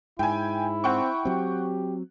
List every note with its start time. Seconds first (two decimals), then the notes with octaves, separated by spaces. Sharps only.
0.19 G#2 E4 G5 G#5
0.84 C4 F#5 G5 C#6
1.25 F#3 C4 G4